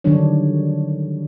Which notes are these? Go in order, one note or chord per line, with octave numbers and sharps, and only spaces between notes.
D3 D#3 F#3 G3 D4 C#5